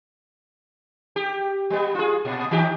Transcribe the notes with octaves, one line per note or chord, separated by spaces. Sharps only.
G4
G3 B3
F4 G#4
A#2
D#3 D#4 G4